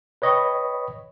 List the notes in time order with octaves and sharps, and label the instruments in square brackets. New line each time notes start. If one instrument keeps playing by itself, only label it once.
[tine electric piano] B4 C#5 D#5 G5 B5 C#6